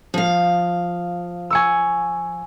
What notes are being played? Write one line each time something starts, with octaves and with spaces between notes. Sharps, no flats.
F3 F5
G#5 C#6 E6